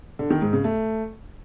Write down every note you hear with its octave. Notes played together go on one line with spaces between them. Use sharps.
D3
D#3
G#2
C#3
A3